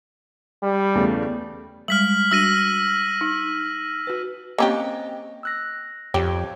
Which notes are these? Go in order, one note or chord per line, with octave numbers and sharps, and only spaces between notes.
G3
E2 C#3 A3
G3 G#3 F6 B6 F#7
G3 D4 F#4 E6 A#6 D#7
D#4
F#4 B4
A#3 C4 C#4 G4 D#5
E6 F#6 A#6
F2 G4 C#5 G5